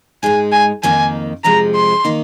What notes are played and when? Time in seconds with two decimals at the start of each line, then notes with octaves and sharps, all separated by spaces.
0.23 G#2 G#3 D#4 G#5
0.52 G#5
0.83 F2 D#3 A#3 D#4 G#5
1.44 F2 C3 F3 G#3 A#5
1.75 C6
2.05 D#3 A#3 D#4